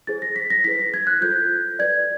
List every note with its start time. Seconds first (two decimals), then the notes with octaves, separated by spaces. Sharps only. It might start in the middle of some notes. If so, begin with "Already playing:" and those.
0.07 E4 G#4 C5 A6
0.22 A#6
0.36 B6
0.50 A#6
0.64 E4 G#4 B4 B6
0.79 A#6
0.94 G#6
1.07 F#6
1.21 F4 A4 C5 G6
1.79 F#4 B4 D5 G#6